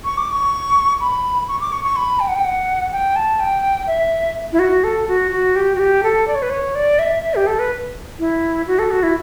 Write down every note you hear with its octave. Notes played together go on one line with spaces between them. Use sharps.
C#6
D6
C#6
B5
C#6
D6
C#6
C#6
B5
G5
F#5
G5
F#5
G5
A5
G5
E5
E4
F#4
A4
F#4
F#4
G4
F#4
G4
A4
D5
C#5
B4
C#5
D5
E5
E5
G4
A4
B4
E4
F#4
A4
F#4
E4